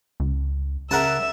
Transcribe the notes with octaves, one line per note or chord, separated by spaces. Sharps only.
C#2
C#3 A#4 E5 F#5 A5